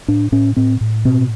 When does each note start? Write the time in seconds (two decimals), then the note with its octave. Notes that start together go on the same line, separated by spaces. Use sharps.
0.08 A2 D4
0.32 A2 C#4
0.57 A2 C4
0.81 A2
1.05 B2 C4